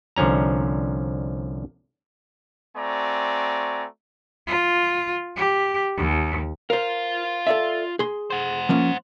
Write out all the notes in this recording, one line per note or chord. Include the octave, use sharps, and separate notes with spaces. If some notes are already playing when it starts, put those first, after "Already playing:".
C2 D3 F3 C#4 A#5
A3 C4 F#4 D5 G#5 A#5
F4
G4
D#2
F4 A#4 C5 F5
A4 D5 E5
G#4 C6
C5 F#5
F3 A#3 C#4